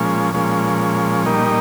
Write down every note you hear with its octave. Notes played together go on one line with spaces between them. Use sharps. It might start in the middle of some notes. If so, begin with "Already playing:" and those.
Already playing: A#2 F3 G#3 C#4
A#2 F3 G#3 C#4
A#2 G3 A#3 D#4